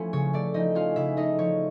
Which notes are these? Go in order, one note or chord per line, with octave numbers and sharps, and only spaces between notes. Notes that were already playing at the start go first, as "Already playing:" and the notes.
Already playing: F3 A3 C#4 E4
C#3 C#5
A3 D5
F3 D#4 D#5
C#4 F4 F5
C#3 E4 E5
A3 D#4 D#5
F3 C#5